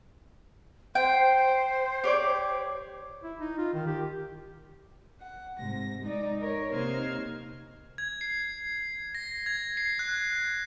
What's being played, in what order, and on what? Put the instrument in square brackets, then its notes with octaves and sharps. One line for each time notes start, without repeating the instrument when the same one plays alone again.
[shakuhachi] C5 [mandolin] G5
[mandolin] G4 C#5 D5
[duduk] E4
D#4
F4
D#3
G4
[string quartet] F#5
G#2 C3 A#6
G#3 D#4 D5
A#4 C#5
C3 A#3 D#4 C5 F6 G#6
[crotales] G#6
C7
A#6
G#6
C7
F#6